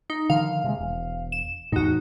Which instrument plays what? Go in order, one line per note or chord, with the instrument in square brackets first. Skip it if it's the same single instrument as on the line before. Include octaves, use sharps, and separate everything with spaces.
[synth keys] D#4
[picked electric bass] D3 D#3 F3 [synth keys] F5
[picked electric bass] C3 F3 G#3
E1
[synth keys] E7
[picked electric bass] E2 A2 [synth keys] D#4 F#4